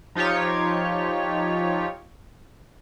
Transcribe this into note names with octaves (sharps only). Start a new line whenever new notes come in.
F3 D#4 F4 G4 C#5